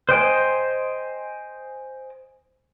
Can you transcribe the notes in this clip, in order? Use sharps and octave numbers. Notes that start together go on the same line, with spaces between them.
C5 D#5 G5 G#5